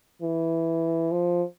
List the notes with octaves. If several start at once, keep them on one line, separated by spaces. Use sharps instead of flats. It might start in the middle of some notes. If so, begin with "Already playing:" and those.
E3
F3